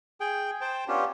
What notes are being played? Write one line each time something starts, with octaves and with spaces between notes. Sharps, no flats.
G#4 G5
C5 G5 A5
B3 C#4 D4 F4 G4